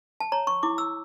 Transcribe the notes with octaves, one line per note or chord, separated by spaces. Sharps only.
A5
C#5 A#5
C#6
E4 D6
E6